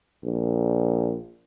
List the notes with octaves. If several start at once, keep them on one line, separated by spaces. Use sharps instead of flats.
A#1